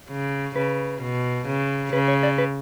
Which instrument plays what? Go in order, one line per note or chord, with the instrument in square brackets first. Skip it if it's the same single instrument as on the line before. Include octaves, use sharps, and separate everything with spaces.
[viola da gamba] C#3
[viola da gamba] C#3 [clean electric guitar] B4
[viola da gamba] B2
C#3
[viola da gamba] C#3 [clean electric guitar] B4
[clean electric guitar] C#5
D5
B4